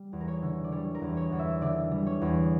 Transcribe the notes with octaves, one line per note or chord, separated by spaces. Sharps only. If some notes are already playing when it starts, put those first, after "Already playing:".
Already playing: G3
E2
A#4
C#5
D3
D5
G3 C#5
A#4
E2
C#5
E2
E5
D3 D5
G3
C#5
E2